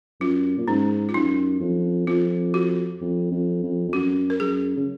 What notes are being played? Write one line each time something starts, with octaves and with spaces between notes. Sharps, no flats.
F#2 F4
A#2
G#2 C#4
F4
F#2 D#4
F2
F2 F4
F#4
F2
F2
F2
F2
F#2 F#4
A#4
F#2 G#4
C#3